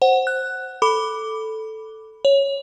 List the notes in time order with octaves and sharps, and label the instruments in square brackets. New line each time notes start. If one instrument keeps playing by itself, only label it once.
[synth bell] C5 F#5
F#6
A4 B5 D6
C#5